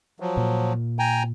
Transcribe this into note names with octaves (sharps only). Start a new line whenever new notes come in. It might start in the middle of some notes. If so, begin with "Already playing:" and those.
F3 F#3
A#2
G5 G#5 A#5